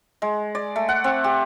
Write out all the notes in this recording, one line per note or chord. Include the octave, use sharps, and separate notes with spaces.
G#3
D5
A3
F#5
C4
G4